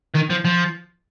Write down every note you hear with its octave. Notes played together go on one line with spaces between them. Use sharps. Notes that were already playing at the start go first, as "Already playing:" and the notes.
D#3
F3
F3